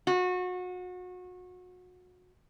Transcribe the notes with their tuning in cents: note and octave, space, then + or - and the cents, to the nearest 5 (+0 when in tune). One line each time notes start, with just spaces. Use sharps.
F#4 -30